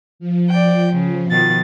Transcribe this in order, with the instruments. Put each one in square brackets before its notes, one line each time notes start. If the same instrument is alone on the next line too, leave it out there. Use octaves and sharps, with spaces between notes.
[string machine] F3
[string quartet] D5 G5
C#3
B2 D#3 A6